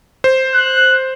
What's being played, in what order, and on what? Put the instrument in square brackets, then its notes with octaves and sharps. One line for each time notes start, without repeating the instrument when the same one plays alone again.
[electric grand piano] C5
[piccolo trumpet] F#6